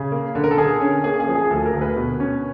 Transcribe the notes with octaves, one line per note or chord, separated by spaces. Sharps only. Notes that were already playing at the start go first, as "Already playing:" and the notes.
Already playing: C#3 G#4
A#3
D3
A#4
A4
D3 G#4
C#4
A#3 G#4
G#4
F3
G#4
D2 A4
A#4
D2
B4
B2
C#4